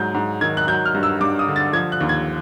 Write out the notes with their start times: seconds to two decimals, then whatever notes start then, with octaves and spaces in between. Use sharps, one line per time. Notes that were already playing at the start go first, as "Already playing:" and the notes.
Already playing: G#2 F#3 G6
0.14 G#2
0.41 D#3 G#6
0.57 F#6
0.67 F#3 G6
0.86 F6
0.94 G2
1.03 E6
1.21 G2 D6
1.39 D#6
1.48 D3
1.56 A6
1.73 F3 G#6
1.92 F#6
2.01 D#2
2.09 G#6